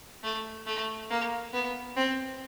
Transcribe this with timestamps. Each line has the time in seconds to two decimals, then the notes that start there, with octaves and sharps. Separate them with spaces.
0.23 A3
0.66 A3
1.10 A#3
1.53 B3
1.96 C4